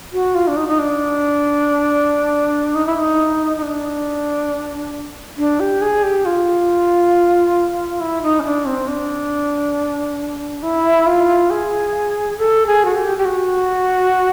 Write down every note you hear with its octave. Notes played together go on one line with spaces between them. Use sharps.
F#4
F4
D4
D#4
D#4
D4
D#4
E4
D#4
D#4
D4
D4
G4
G#4
G4
F4
E4
D#4
C#4
D4
C4
D4
E4
F4
G#4
A4
G#4
F#4
G4
G4
F#4